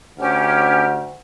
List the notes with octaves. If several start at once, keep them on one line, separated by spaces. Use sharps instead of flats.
D2 C#4 G4 F6